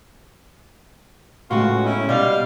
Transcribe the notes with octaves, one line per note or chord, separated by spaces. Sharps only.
A2 C#3 G#3 B3 F4 F#4
C#4 D#4 E4
B2 G3 F5